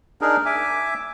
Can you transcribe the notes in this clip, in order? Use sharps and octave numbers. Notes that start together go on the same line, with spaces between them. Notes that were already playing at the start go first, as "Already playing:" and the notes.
D4 D#4 G#4 A#4
E5 G#5 D6